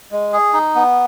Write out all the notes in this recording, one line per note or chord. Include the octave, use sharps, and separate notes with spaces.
G#3
G#4
D#4
B3